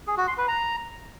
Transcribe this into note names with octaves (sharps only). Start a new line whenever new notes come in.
G#4
F#4
C6
B4
A#5